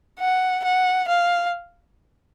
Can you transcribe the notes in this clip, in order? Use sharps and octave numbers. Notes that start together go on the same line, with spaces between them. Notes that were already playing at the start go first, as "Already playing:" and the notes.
F#5
F#5
F5